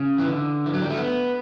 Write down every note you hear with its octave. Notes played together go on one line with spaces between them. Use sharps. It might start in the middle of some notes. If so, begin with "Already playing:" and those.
Already playing: C#3
E3
D3
E3
F#3
G3
A3
B3